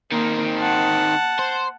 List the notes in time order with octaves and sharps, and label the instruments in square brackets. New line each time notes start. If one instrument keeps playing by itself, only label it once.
[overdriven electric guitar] D#3 C4 [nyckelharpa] A#3
[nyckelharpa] F#5 A5
[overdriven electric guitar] C5